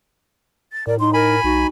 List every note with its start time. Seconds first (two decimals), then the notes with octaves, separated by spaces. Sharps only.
0.72 A6
0.87 A2 A#4 D5
1.00 D#4 C6
1.14 A#4 G#5 B5
1.44 B1 D#4 F#4